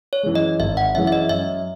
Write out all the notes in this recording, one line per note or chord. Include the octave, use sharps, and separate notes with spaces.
C#5
F#2 E3 G#3
D#5
G#1 E5
F#5
F#2 E3 G#3 E5
E5
D#5
F#2 E5